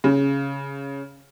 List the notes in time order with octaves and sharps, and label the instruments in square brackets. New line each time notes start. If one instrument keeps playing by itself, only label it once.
[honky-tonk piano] C#3